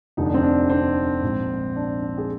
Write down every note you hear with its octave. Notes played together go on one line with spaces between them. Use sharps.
F1 D#2 D3 F3 D#4
D4
C4
D4
C4
A#1 G#2 F3
D4
D4
G#4